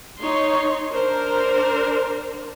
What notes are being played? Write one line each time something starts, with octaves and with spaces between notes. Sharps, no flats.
D#4 C#5 C6
D4 A#4 C5